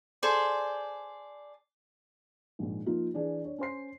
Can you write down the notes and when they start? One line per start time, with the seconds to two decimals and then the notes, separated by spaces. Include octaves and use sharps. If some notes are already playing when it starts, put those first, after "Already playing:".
0.23 G#4 A4 C5 D5
2.59 A#1 G#2
2.86 F3 A#3 D#4 F4
3.14 E3 D4 G#4
3.42 D4 C#5
3.58 C#4 C5 C6 C7